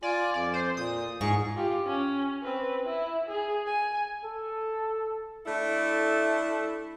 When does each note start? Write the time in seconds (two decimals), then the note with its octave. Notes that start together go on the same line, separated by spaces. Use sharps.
0.02 F4 D5 G#5
0.34 F2 D5
0.54 C5
0.77 A#2 D#6
1.21 G#2 G#4 C#6
1.56 F4 G4
1.86 C#4
2.43 C4 B4
2.86 E4
3.28 G#4
3.67 G#5
4.24 A4
5.46 A3 D4 E4 A4